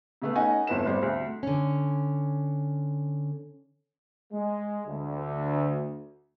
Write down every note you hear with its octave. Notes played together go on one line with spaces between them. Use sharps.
C#3 A3 B3
C#4 D#4 D#5 F#5 G#5
G1 F2 E4 B4 E7
G#1 G3 C5
D2
D3 C#4
G#3
D2